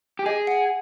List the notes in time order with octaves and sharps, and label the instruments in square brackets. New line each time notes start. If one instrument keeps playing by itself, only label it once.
[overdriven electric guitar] G4
[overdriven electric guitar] G#4 [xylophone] D#5
[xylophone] F#5